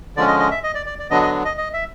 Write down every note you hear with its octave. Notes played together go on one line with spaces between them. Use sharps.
D3 F3 G#3 C#4 D5
D#5
D#5
E5
D#5
D5
D5
D5
D3 F#3 B3 D4 D#5
D#5
D#5
D#5
E5